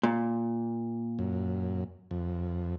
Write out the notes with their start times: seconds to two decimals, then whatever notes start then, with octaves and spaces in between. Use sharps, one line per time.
0.03 A#2
1.19 F#2
2.11 F2